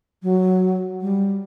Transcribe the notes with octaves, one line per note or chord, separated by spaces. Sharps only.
F#3
G3